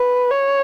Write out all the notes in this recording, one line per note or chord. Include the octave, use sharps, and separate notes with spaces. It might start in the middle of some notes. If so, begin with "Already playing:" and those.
Already playing: B4
C#5